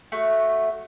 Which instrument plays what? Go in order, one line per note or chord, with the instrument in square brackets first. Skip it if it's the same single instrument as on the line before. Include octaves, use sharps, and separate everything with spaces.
[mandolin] A3 F#4